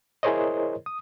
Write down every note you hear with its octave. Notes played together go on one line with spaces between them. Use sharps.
E4 G#4 A#4 C5 C#5 D#5
D#6